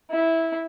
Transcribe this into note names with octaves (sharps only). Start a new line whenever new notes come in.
E4